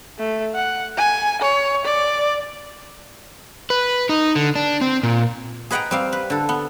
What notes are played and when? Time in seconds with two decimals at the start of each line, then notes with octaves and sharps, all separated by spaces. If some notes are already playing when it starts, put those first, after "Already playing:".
0.19 A3
0.55 F#5
0.98 G#5
1.42 C#5
1.85 D5
3.70 B4
4.09 D#4
4.35 D3
4.55 D4
4.81 C4
5.03 A#2
5.71 G#4 B4 D#5 F#5 G5 A#5
5.91 G3 C4 F5
6.12 B4
6.30 D3 A4
6.49 B3